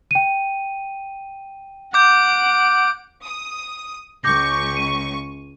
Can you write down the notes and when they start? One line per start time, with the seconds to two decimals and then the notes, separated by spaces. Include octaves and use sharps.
0.11 G5 D#7
1.94 F#5 D6 G6 D7
3.23 D#6
4.24 C#2 C#6 D6 G6 A#6
4.77 D#7